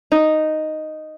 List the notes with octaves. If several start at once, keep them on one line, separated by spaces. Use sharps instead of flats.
D#4